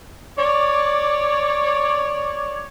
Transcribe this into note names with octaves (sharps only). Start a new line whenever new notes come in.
C#5 D5